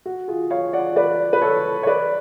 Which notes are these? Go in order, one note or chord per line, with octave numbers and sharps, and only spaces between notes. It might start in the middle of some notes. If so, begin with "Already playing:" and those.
F#4
F4 G#4
C#5 F5
D5 F#5
B4 D5
B4
A4 C#5
C#5
B4 D5